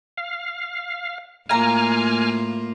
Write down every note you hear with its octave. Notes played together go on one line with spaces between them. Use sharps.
F5
A2 A#3 F4 F5 G#5 A#5 F6